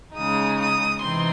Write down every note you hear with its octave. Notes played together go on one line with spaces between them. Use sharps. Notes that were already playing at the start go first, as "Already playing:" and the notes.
C#3 G#3 D#4 D#6
D#6
C3 E3 C4 D#4 C6